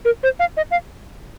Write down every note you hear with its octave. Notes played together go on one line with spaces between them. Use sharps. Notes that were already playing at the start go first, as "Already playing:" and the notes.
A#4
C5
F5
D#5
F5